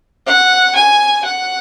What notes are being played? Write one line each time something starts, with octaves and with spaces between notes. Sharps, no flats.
F#5
G#5
F#5